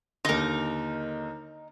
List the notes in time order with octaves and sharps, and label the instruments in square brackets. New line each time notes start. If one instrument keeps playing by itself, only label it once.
[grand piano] D#2 D3 [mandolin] D#4 A#4